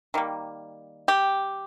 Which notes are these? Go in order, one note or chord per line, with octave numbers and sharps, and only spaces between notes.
D#3 G3 A#3
G4